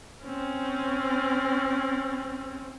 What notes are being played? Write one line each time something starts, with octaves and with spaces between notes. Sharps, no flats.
C4 C#4